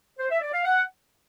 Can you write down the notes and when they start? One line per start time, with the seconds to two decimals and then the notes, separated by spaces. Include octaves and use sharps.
0.18 C5
0.30 E5
0.41 D5
0.52 F5
0.64 F#5